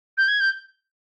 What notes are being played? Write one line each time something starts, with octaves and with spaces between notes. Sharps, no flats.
G6
G#6
G6